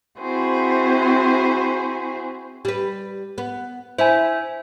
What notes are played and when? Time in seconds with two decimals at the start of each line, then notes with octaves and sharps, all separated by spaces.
0.19 C4 E4 F#4 G#4 C5
2.65 G3 B4
3.38 B3
3.99 E4 C5 E5 G#5